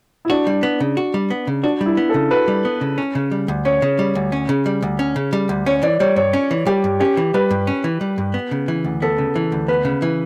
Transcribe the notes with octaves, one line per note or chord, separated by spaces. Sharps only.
E4
D4 F#4
G3
B3
C#3
F#4
G3
B3
C#3
D4 F#4
G3
E4
B3
A4
C#3
F#4 B4
G3
B3
C#3
C#4
C#3
G3
D2
C#4 C#5
C#3
G3
D2
C#4
C#3
G3
D2
C#4
C#3
G3
D2
C#4 C#5
E3 D5
G3 C#5
G2 C#5
C#4
E3
G3 G4
G2
C#4 G4
E3
G3 B4
G2
C#4
E3
G3
G2
B3
C#3
E3
D2
B3 A4
C#3
E3
D2
B3 B4
C#3
E3